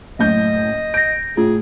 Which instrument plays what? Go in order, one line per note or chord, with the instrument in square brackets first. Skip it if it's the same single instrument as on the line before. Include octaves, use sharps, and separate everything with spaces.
[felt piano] F#1 A2 G6 [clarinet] D#5
[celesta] G6 A#6 [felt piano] D7
[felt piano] A2 [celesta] F4 [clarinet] G#4